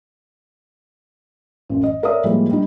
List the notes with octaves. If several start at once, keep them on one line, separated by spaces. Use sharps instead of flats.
A1 F#2
D#5
A4 A#4 C#5 D5 E5 D#6
A2 F3 G3 G#3 A#3
G3 D4 D#4